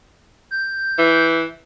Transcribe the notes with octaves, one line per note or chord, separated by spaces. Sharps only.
G6
E3